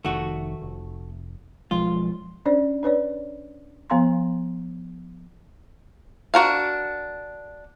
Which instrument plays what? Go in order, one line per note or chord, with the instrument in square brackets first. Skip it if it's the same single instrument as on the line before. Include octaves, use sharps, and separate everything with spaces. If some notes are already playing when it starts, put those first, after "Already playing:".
[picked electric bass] F1 D#3 [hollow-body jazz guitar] A3 F#4
[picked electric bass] F1
[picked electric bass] B1 F3 G#3 [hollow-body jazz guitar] F4
[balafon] C#4 D4 C5 D5
D4 B4 C#5 D5
F3 B3 F5 A#5 C6
[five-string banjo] D4 F#4 A#4 F5